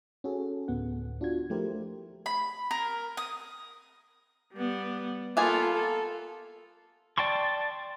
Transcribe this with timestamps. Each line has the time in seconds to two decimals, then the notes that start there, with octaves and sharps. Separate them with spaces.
0.24 C#4 F#4 G#4 A4
0.68 D2 A2 B3 F#5
1.21 D4 F4 F#4 G#6
1.50 F3 A3 E4 G4 A#4 C5
2.26 B5
2.71 A#4
3.17 D#6
4.54 G3 B3
5.37 A#3 B3 F4 A4 G#5
5.73 A4
7.18 D5 G5 A5 C6 C#6